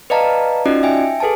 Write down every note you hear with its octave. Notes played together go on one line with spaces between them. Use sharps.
B4 D5 D#5 F5 A5 A#5
C#4 D#4 F4 F#4 D5 D#5
E5 G5 G#5
G#4 A4 B4 G#5 A5